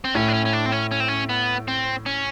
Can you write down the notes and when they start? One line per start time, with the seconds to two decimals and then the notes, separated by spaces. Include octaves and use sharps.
0.04 C4
0.14 A2 C#4
0.28 D4
0.34 C#4
0.45 C#4
0.53 D4
0.66 C4
0.72 C#4
0.91 C#4
1.00 C4
1.08 C#4
1.29 B3
1.68 C4
2.06 C#4